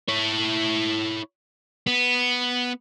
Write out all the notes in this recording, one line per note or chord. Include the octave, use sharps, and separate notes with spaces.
E4 C#5
B3